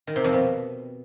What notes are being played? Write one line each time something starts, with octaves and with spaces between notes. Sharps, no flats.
D#3
C3
F2
B2